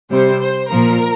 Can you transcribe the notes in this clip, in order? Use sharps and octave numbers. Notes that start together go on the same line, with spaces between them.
C3 G3 C5
C5
A#2 F3 A#4